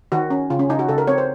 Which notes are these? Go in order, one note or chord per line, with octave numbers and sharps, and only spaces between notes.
D#3 F#4
C#4
C#3 F4
C#4
C#3 D#4
F#4
C#3 A4
A#4
C4 C#5
C5